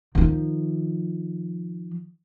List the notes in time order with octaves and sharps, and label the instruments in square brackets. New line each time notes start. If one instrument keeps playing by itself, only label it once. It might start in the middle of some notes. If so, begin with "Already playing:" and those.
[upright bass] D#3 F3